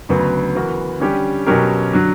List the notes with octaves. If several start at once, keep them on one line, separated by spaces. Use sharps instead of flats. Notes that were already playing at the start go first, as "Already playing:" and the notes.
D2 C#3 F#3 B3
E3 B3 F#4 A#4
D3 G3 C#4 G4
B2 F#3 C#4 G4 A#4
D3 F#3